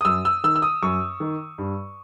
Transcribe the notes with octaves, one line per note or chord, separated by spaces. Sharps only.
D#6
F#2 E6
E6
D#3 E6
E6
D#6
F#2 C#6
D#3
G2